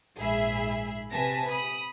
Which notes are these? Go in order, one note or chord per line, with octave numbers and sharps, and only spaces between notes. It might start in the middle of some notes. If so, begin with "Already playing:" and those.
A#1 G#2 G#4 E5 B5
C3 B4 G#5 A5 A#6 B6
B5 D#6